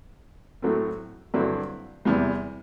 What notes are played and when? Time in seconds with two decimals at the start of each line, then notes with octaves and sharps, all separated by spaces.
0.62 A2 F#3 A3 C4
1.34 G2 D3 F#3 C4 E4
2.05 E2 C3 G3